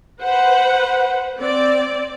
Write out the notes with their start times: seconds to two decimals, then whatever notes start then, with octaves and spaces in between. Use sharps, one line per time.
0.20 B4 C5 F#5
1.39 C4 D5